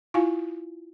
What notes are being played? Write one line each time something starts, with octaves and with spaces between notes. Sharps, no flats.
E4 F4 F5 G#5